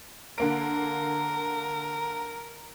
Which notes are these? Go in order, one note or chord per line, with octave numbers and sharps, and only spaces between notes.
D3 A#3 A#4 D7